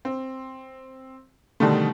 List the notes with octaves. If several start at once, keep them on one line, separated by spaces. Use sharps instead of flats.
C4
B2 D3 D#3 G3 A3